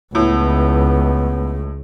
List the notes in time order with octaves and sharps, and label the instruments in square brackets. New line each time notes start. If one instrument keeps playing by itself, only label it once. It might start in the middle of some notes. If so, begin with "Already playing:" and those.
[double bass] C#2 [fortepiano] A2 [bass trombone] B3